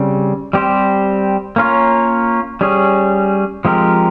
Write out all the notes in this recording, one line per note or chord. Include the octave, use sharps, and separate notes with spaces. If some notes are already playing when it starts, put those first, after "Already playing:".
Already playing: C#3 G3 C4
G3 C4 G4 C5
A#3 C#4 F4 A#4 C#5
G3 C#4 G#4 C#5
F3 G#3 C4 G4 A#4